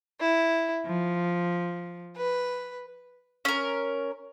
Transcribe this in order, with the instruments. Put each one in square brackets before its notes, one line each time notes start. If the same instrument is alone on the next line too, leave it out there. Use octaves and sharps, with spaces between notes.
[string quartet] E4
F3
B4
[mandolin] C#4 A#4